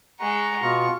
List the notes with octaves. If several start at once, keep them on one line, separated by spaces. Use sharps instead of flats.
G#3 F#5 A#5 C#6
B2 F4 C#6